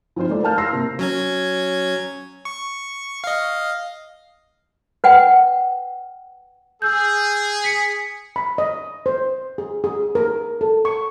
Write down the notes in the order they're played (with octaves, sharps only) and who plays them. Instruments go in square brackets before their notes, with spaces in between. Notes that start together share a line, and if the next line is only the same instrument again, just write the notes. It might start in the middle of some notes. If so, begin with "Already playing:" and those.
[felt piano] F3 C4 D#4 F4 C5
G#3 A3 D5
A#4 F5 A5 F6 G6
C6 E6 F6 A#6 C7
C3 A#3
[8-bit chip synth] F#3 C#4 G#6
C#6
D#5 F5
[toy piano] B4 F#5 G5
[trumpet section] G#4 [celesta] E6 G6
[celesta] B6 C#7
[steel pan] B5
D#5
C5
G#4
G#4
A#4
A4
C#6